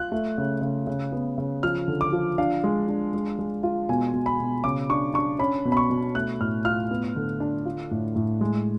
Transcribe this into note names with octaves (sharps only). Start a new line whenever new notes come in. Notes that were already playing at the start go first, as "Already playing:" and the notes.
Already playing: F4 F#6
A3
C#3
C#3
C#3
B3
C#3
F3 F6
D3
D6
F3
D4 F5
G#3
D4
G#3
G#3
F4
B2 G#5
B2
B5
B2
C#3 D6
D4 C#6
D4 C#6
C#4 B5
B2
B5
C#6
B2
A3 F#6
A2 F6
F4 F6
B3
D3
D4
F4
A2
A2
G#3